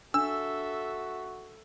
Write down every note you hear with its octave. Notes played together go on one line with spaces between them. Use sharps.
D4 F#4 A4 E5 E6